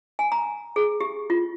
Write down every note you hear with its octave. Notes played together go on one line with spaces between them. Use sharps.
G#5
A#5
G#4
G4
F4